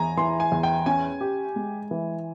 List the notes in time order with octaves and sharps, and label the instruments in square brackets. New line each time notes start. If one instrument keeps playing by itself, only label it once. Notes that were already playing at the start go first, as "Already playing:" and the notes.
Already playing: [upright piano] E2 [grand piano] G#5 A#5
[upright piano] E3 [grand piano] C6
[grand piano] G#5
[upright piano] E2
[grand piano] G5
[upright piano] C#4 [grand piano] G#5
[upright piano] G4
G#3
E3